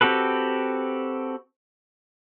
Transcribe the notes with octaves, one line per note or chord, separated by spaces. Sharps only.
C4 F#4 G4 A4 B4